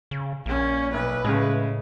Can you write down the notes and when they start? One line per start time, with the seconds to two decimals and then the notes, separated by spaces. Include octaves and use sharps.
0.11 C#3
0.46 A#1 A#3 C#4
0.94 B1 B4
1.25 A2 C#3 G#3